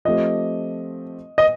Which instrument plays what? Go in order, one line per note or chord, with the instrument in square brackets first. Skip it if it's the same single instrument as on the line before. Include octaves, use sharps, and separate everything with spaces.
[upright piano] F3 A3 C4 G4 [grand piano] D#5
[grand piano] D#5